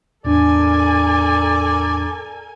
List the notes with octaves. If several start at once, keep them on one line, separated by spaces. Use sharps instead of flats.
E2 A2 D4 A4 A#4 D5 G#5